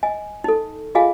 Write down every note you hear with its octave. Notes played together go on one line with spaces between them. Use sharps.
D#5 G#5
D#4 A4
F4 G#4 D#5 F5 G#5